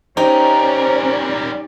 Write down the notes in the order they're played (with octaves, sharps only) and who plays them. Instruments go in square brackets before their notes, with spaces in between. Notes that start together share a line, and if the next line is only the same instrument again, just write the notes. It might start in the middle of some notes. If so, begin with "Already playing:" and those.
[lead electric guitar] G3 A#4 [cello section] C#4 D5 [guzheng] D#4 G4 [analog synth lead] C5